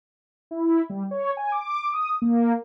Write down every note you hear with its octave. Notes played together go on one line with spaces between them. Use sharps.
E4
G3
C#5
G#5
D6
D#6
A#3